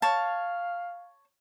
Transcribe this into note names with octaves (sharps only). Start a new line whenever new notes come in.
C#5 F5 A5